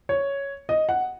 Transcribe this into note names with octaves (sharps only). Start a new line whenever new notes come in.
C#5
D#5
F#5